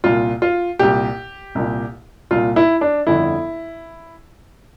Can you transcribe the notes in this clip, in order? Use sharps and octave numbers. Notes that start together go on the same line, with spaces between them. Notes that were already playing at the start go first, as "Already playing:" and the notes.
C2 A#2 F4
F4
C2 A#2 G4
C2 A#2
C2 A#2 F4
E4
D4
G1 F2 D3 E4